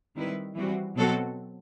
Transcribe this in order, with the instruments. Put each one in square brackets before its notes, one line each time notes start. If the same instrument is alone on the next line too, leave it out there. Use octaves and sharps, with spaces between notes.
[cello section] D#3 G3 C4 E4 B4
E3 G3 C4 F#4
B2 F#3 C4 F#4 A4